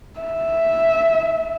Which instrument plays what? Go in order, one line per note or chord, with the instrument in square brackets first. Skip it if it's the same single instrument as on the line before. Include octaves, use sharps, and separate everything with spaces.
[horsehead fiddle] E5